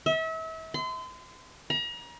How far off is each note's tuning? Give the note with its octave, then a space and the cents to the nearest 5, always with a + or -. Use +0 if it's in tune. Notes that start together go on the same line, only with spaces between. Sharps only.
E5 -35
C6 -35
A#5 +35